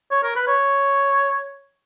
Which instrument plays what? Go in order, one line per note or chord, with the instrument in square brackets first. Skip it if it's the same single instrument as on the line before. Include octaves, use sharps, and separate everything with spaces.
[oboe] C#5
A#4
B4
C#5